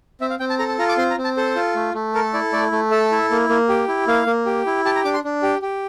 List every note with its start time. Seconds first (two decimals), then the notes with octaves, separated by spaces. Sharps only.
0.21 C4 E5
0.30 F5
0.40 C4 G5
0.50 A5
0.59 A4 A#5
0.68 A5
0.79 F4 A#5
0.89 D6
0.97 C4 C6
1.11 A#5
1.18 C4
1.24 A5
1.37 A4 C5
1.56 F4
1.75 A3
1.94 A3
2.14 A4 A#4
2.34 E4 D5
2.53 A3 D5
2.72 A3
2.91 A4 E5
3.11 E4
3.31 A#3
3.49 A#3
3.69 G4
3.88 E4
4.07 A#3 F5
4.26 A#3
4.46 G4
4.66 E4
4.85 G4 A5
4.95 A#5
5.05 D4 D6
5.14 C6
5.24 D4
5.43 G4
5.62 G4